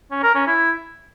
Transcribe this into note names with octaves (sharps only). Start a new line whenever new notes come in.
C#4
A#4
C#4
E4